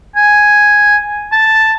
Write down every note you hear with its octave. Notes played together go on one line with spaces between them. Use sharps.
G#5
A5